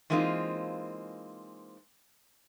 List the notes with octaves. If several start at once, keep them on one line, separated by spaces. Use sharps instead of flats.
E3 G#3 A#3 C4 D#4 F4